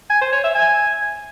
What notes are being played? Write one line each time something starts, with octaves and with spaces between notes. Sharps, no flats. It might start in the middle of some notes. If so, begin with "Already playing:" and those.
G#5
C5
C#5
E5
G#5